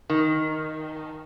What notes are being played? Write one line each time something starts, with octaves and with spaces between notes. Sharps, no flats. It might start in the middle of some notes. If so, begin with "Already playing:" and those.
D#3